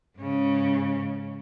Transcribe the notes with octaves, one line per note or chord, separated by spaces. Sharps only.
G#2 C#3